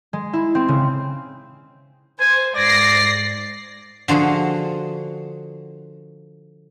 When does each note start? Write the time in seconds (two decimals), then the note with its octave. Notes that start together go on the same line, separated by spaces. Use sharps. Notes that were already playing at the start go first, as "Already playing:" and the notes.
0.13 G#3
0.33 E4
0.55 C4
0.68 C#3
2.20 C5 G#5
2.56 G#2 D5 A#6 C7
4.08 D3 F3 F#4 G#4